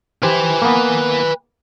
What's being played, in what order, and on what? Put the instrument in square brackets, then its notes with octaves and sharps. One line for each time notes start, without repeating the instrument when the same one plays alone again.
[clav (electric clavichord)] G4 C5 [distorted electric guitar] B4 G#5
[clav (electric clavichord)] A#3 B3